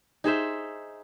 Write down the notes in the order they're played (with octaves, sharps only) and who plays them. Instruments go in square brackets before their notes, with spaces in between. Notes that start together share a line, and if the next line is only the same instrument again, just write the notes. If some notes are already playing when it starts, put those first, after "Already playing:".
[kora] D#4 G#4 C5 E5